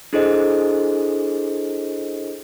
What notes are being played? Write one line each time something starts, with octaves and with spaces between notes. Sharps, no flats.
D4 E4 G#4 A4 C5 D#5